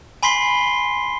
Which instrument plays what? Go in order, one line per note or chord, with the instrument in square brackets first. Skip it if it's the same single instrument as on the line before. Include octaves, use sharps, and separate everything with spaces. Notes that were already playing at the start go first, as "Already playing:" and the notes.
[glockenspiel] G#5 B5 C6 B6 C7 G7